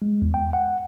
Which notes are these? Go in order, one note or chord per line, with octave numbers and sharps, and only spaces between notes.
G#3
E2
G5
F#5